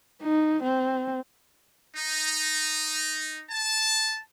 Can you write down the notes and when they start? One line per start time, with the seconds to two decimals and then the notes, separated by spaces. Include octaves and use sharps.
0.22 D#4
0.63 C4
1.96 D#4
3.51 A5